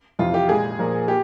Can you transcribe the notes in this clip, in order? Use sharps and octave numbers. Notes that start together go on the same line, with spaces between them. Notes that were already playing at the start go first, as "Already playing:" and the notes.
F2 C3 E3 F4
G4
A#2 G#3 G#4
A#2 F3 A#3
G4